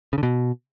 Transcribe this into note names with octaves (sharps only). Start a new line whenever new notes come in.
C#3
D3
B2